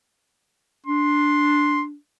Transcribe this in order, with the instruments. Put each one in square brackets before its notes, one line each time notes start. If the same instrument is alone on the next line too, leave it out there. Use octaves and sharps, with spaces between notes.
[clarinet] D4 [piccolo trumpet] C6